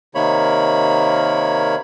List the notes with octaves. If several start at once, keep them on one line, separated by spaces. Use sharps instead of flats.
C3 D#3 A#3 C#5 B5